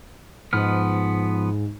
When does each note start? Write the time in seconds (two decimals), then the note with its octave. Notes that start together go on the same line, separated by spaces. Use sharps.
0.53 G#2 F3 B3 F6